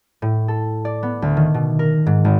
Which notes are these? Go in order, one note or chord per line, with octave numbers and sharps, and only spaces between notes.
A2
A4
D5
B3
D2
D#3
B2
A#4
G#2
G#1